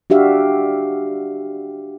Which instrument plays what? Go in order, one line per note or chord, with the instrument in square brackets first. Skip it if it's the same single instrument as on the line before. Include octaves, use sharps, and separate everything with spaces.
[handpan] D4 F#4 G4 E5 F5